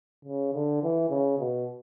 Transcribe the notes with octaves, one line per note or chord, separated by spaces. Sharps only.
C#3
D3
E3
C#3
B2